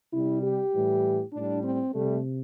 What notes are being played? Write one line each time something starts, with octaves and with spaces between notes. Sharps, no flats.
C3 G3 E4
G4
A2 E3 G3
A2 G3 D4
C4
C3 G3 A3